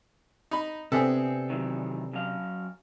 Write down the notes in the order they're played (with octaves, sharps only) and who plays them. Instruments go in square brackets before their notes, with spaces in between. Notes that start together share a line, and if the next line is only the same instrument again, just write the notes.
[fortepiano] D#4 B5
[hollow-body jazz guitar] C3 B3 D4 [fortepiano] C4 G#4 A4
[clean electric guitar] D#3 E3 F#3
F#2 F#3 F5